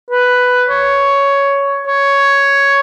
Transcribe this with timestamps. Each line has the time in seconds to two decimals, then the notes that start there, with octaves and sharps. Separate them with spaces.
0.10 B4
0.68 C#5
1.87 C#5